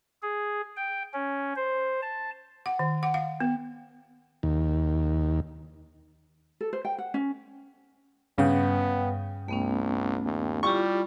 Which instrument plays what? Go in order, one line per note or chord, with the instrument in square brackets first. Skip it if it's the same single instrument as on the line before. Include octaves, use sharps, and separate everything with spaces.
[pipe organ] G#4
G5
C#4
C5
A5
[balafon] F#5
D#3
F#5
F5
B3
[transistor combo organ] D#2
[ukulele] A4
C5
G5
F#5
C#4
[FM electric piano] G2 G5 [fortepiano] C#3 [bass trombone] B3
[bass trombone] C2 [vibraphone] A3 B3 C#4
[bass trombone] D#2
[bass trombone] G3 [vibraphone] E4 F4 G4 [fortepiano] C#6